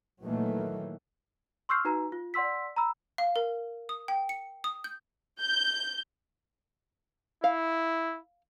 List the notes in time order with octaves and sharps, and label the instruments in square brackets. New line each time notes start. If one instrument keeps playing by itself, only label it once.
[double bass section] A#2 D#3 E3 F#3 A3 A#3
[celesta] C6 C#6 E6 F6 G6 C7
D#4 F#4 B4 A#5
F4
D5 F#5 C6 E6 B6
A#5 B5 E6
[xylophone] F5
A#4
D#6
G5
C#7
D#6
G6
[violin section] G6
[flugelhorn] E4 [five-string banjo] F5